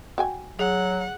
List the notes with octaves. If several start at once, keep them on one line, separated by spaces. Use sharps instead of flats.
F#4 G5 G#5
F#3 G#4 F#5